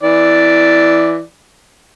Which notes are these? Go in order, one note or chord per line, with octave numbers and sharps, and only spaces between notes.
E3 D5